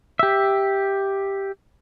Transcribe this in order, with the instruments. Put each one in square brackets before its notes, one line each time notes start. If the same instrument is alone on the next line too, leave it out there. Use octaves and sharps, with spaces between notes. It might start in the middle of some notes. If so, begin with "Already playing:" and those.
[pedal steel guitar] G4 E5